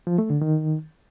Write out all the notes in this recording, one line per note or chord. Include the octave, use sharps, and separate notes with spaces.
F3
A3
D3
D#3